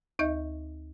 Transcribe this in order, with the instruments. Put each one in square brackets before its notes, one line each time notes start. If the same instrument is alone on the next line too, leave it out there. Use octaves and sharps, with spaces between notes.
[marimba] D2 D#4 D#5 E5 G6